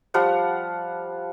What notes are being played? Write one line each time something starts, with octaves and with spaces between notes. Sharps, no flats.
F3 G3 F5 F#5